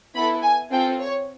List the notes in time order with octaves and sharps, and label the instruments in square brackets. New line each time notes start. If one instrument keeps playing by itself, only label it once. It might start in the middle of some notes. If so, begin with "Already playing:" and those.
[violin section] B3 E4 A4 B5
G#5
C4 F4 A4 G5
C#5